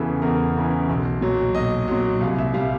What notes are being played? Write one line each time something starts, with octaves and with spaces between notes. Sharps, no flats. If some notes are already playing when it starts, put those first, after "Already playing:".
Already playing: E2 C#3 E3 A4
E2 A#4
C#3 E3
B1
A#2 F#3
B1 D#5
A#2 F#3
C2 F5
E5
A#2 G3 F5